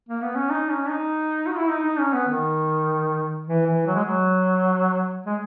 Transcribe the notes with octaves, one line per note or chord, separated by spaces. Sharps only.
A#3
B3
C#4
D#4
C#4
D#4
F#4
E4
D#4
D#4
C#4
B3
D#3
E3
E3
F#3
G#3
F#3
G#3